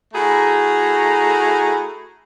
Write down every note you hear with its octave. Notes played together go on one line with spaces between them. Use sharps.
A3 E4 F#4 G#4 A#5